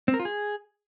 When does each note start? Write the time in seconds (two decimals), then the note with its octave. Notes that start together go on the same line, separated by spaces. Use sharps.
0.08 C4
0.14 A#4
0.19 F4
0.25 G#4